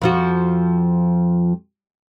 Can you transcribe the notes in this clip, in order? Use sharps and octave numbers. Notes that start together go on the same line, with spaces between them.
F2 F3 F#4